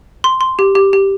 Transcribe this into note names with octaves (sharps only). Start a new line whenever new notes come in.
C6
C6
G4
G4
G4